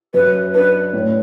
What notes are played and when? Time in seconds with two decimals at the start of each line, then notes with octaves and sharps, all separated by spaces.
0.14 F#2 B4
0.54 D4 B4
0.93 A2